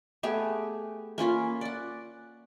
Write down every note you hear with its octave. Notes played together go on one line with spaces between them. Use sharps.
A3 B3 G4 G#4
A#3 C#4 F4 B5
D5 F#5